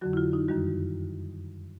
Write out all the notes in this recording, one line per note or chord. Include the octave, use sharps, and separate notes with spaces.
F2 D3 F#3 F#4
E4
F4
D#4
F#2 D#3 G3 F#4